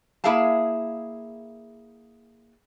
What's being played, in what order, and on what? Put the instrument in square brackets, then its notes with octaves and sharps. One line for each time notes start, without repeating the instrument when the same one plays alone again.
[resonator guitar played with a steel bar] A#3 E4 G#4 E5 F5 A5